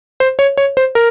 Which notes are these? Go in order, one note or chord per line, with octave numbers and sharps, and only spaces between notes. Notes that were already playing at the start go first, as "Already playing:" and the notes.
C5
C#5
C#5
C5
A#4